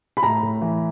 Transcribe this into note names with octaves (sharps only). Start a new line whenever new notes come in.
B5
A2 A#5
A2
E3